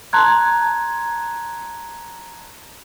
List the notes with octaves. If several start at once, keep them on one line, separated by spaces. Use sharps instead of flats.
A5 A#5 C6 F#6 G#6